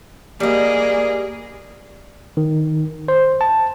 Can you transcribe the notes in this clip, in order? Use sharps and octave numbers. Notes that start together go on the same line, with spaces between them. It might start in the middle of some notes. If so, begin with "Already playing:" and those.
G3 A#3 G#4 D#5
D#3
C5
A5